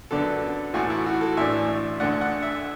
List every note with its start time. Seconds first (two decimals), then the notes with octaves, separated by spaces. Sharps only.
0.11 F#2 D3 B3 D4 A4
0.74 A1 A2 E3 A3 F#4
0.90 E4
1.06 F#4
1.21 A4
1.37 A1 A2 E3 D4 E5
2.00 D2 D3 A3 D4 F#5
2.21 F#5
2.42 E5